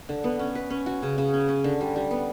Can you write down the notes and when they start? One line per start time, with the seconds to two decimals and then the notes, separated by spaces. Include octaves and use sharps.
0.09 D3
0.24 B3
0.39 C#4
0.55 B4
0.70 C#4
0.86 F#4
1.02 C#3
1.18 C#3
1.34 C#4
1.49 C#4
1.64 D3
1.81 G3
1.96 G3
2.11 B3